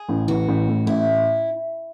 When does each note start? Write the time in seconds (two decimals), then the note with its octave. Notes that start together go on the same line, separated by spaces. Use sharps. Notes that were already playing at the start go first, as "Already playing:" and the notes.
Already playing: G#4
0.09 A1
0.28 E3 F#4
0.48 A1
0.67 A2
0.87 A1 E4